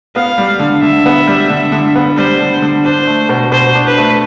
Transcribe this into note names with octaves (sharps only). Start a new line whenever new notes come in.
B3 F5
G3
D3
D3 E5
B3
G3
D3
D3
B3
G3 C5
D3
D3
D4 C5
A3
B2
B2 C5
D4
B4
A3